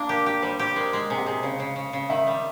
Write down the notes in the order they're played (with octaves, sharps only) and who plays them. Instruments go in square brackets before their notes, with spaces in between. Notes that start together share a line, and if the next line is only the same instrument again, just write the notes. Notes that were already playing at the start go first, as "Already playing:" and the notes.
Already playing: [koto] A#3 D4
[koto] G4 [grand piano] A#4
[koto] G4
[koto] G3 [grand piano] C5
[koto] G4 [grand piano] C5
[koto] G#3 [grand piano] A#4
[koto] G#3
[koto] C3 [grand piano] G#4
[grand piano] G4
[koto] C3 [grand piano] G#4
[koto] C#3 [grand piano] C5
[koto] C#3
C#3
C#3
[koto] D#3 [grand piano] E5
[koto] G3